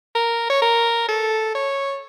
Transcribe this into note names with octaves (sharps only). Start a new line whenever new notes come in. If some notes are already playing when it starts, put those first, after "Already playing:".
A#4
C#5
A#4
A4
C#5